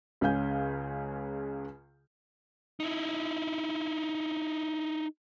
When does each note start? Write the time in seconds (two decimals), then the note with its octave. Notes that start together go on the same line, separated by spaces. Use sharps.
0.21 C#2 C#3 G#3 F5 G#5 G6
2.80 D#4 E4